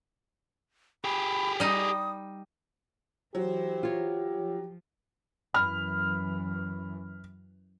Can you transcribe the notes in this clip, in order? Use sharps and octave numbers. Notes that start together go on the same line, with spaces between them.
G4 G#4 B5
G3 D#4 D#6
E3 F#3 E4 G4 C5
F4 C#5
F3
F#2 E3 B5 F6